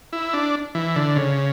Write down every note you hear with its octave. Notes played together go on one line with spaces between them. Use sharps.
E4
D4
E3
D3
C#3